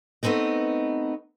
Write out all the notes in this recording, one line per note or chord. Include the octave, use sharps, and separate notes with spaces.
A3 B3 C4 D#4 D#5